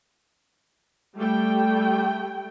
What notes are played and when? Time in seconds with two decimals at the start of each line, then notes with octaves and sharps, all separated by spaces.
1.16 G3 A3 G5